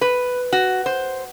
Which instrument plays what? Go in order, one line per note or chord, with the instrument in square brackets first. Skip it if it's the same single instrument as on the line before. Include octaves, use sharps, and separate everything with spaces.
[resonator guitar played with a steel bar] B4
F#4
C5